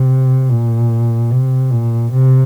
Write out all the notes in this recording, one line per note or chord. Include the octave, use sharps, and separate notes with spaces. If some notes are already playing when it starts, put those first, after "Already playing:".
Already playing: C3
A#2
C3
A#2
C3